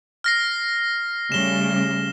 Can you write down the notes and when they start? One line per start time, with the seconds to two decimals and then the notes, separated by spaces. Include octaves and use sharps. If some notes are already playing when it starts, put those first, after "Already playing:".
0.24 F6 A#6 C7
1.32 C#3 G3 A3 E7 G7